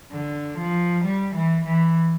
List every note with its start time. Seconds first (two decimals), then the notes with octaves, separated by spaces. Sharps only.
0.12 D3
0.58 F3
1.05 G3
1.35 E3
1.65 E3